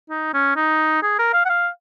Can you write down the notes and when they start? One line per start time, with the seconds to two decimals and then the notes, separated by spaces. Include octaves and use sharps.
0.10 D#4
0.34 C#4
0.56 D#4
1.03 G#4
1.19 A#4
1.33 F5
1.45 F#5
1.49 F5